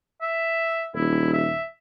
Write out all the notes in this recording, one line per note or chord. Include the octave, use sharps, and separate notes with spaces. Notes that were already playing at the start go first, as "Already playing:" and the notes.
E5
D#1 E4
E5